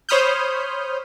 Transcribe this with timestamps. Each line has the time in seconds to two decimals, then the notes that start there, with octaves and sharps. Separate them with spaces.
0.09 C5 C#5 B5 D#6 F6 G6